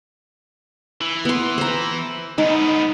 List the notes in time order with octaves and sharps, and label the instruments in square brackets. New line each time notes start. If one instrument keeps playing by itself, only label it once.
[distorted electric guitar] E3
[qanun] B3 C6
C5 A#5
[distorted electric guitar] G#2 B3 [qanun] D#4